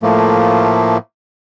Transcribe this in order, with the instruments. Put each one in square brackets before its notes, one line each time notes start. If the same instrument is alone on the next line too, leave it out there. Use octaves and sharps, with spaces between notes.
[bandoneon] A2 F3 A3 A#3